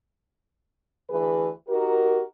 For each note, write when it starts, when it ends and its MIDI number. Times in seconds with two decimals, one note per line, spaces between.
1.10 1.49 38
1.10 1.49 52
1.10 1.49 68
1.10 1.49 71
1.69 2.22 63
1.69 2.22 66
1.69 2.22 67
1.69 2.22 70